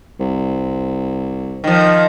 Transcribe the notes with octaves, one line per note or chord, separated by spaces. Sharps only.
C2
D#3 F3